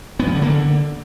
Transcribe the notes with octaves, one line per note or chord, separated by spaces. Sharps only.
B3
F3
D3
A#3
D3